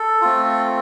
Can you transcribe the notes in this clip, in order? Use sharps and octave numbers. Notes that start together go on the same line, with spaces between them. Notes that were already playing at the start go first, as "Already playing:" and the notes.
Already playing: A4
A3 C4 F4